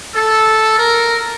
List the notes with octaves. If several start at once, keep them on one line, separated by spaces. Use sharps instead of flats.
A4
A#4